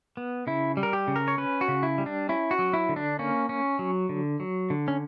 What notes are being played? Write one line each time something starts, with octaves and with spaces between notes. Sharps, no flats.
B3
C#3 E4
G3
A#4
G4
C#3
A#4
C#5
C#4 B4
F#4
C#3
E4
G3
D4
C#4 E4
F#4
F#3
E4
D3
D4
A#3 C#4
C#4
F#3
D3
F#3
D3
C#4